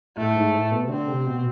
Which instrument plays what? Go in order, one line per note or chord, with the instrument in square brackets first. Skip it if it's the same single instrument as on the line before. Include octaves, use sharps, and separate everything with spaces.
[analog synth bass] A2 [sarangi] A3
[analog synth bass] G#2
A2
B2
C3
[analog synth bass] D3 [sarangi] C4
[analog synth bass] C3
B2